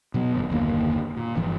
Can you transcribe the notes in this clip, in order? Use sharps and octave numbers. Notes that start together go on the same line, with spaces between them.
B2 F#3 B3
G1 F#2
F#1 D#2 D3 A#3
A#2
F#1 G2 E3 F3